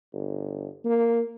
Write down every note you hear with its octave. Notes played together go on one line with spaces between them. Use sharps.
G1
A#3